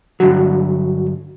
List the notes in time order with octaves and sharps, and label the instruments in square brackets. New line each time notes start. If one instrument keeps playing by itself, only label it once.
[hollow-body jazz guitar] G2 D3 F#3 [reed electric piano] F#4